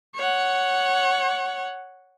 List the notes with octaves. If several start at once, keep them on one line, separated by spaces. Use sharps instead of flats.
C#5 F#5